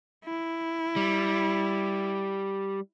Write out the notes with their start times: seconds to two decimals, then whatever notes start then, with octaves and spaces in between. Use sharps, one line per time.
0.25 E4
0.96 G3